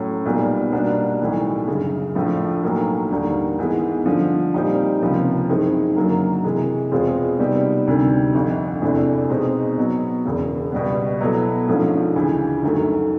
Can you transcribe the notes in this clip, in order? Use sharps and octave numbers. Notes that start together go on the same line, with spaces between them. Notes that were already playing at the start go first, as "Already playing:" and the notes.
Already playing: A2 F#3 A3 C#4
B1 A#2 G3 B3
B2 G3 A#3 D4 F#4
B1 A2 E3 G3
G1 F#2 C#3
A#1 A2 F3
B1 A2 F#3 A#3
D#2 D3 G3 A#3
G#2 E3 G#3 B3
G2 D3 F3
A#2 G3 C4 D#4 G4
C#2 C3 F3 A#3 C#4
F#2 D#3 G#3 C4 E4
F#1 F#2 D3 F#3 A#3
C3 E3 G#3
E2 B2 G#3 C4 F4
C3 D#3 G3 B3
D2 C3 D#3 G3
G1 F2 D3
E2 C3 E3 A3 D4
B2 G#3 C4 D#4
B2 F#3 B3
E1 E2 C#3
C#2 B2 G3 B3
B2 F#3 B3 E4 A4
A#1 G#2 F3 A3 C#4
D2 C#3 E3
G1 F#2 D#3 F#3 A3